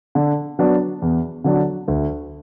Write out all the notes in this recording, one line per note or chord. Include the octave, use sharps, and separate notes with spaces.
D3
F#3 B3 D4 F#4
E2
D3 F#3 D4 F#4
D2